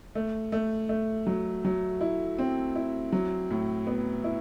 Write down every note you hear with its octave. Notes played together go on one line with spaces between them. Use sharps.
A3
A3
A3
F#3
F#3
E4
C4
E4
F#3
A2
B3
E4